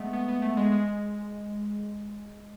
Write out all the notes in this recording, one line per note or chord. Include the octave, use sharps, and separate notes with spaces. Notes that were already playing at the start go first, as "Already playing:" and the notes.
Already playing: G#3 A3 B3
B3
B3
A3
G#3
G#3